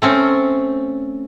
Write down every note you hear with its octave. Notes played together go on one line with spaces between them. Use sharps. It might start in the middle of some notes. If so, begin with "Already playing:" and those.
A3 C4 C#4